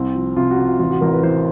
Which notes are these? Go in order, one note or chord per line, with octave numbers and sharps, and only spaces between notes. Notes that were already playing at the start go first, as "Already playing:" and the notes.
Already playing: C2 C4
F3
C3 F4
F#4
C3
F4
A1 F4
F#4
A1 A#4
B4
E3 C5